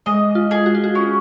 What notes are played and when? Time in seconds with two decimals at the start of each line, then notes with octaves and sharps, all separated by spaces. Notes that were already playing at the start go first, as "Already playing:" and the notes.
0.06 G#3 D#5
0.35 F4
0.51 G#4
0.66 F#4
0.75 F4
0.84 F#4
0.95 C#4